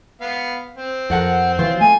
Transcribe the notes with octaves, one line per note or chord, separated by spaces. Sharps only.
B3 F5
C4
F2 A#4 F#5 A5
E3 F#3 F4
A3 G#5